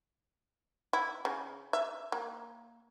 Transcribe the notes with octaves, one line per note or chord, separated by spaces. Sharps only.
E4
C#3
E5
A#3